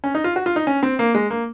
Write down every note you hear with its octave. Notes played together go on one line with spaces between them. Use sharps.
C#4
D#4
F4
F#4
F4
D#4
C#4
C4
A#3
G#3
A#3